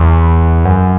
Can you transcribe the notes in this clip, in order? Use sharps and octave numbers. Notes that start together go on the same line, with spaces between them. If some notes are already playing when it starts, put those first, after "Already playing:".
Already playing: E2
F#2